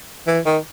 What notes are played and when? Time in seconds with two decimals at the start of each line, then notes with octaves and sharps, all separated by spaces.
0.27 E3
0.46 D#3